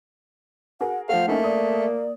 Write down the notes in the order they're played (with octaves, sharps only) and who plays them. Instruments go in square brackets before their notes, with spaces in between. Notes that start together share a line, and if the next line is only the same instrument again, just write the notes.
[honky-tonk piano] F#4 G#4 A#4 [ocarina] F#5
[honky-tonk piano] F3 A3 [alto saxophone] C5 [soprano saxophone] F5 [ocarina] F#5
[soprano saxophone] A3 [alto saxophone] A#3 [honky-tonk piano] C#4 D#4 E4
[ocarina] D5 [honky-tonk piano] D#6